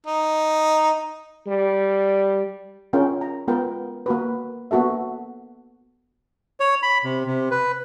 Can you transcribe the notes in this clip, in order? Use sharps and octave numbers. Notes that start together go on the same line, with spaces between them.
D#4
G3
C#4 F4 G#4 A#4 F5 G5
A#5
G#3 B3 F4 A#4 B4 G5
A#3 F#4 B4
A#3 B3 F#4 A4 E5
C#5
B5
C3
C3
B4